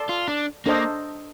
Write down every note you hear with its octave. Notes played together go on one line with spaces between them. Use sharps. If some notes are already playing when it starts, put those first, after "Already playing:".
Already playing: A4 D5 A5 C6
F4
D4
A#3 D4 A4 C5 D#5